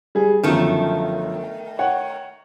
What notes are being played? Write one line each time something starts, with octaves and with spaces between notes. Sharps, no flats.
G3 G#4
G1 F#2 D#3 F3 A3
C#5 F#5 G5